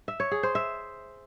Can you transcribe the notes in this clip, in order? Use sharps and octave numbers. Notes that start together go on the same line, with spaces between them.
E5
C#5
G#4
C5
E5